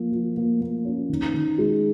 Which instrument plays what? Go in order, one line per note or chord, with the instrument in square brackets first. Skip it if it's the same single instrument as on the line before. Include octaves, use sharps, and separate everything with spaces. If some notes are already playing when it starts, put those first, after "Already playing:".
Already playing: [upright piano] F3 A#3
F3
A#3
A#3
C#4
D#3
D#3
G#3